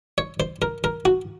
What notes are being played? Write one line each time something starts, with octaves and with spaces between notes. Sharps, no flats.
C#5
C5
A#4
A#4
F#4